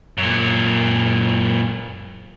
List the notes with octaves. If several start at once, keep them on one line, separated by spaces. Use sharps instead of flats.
F#2 A#2